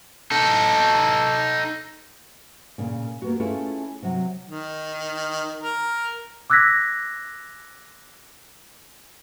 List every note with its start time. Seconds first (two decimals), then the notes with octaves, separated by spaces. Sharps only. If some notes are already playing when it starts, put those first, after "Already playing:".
0.31 D#4 A4
2.78 A#2 C#3
3.22 A#3 B3 F#4
3.40 A3 C#4 E4 F4 G#4
4.02 C3 F#3
4.49 D#3
5.61 A#4
6.50 D6 E6 F#6 G#6 A#6 B6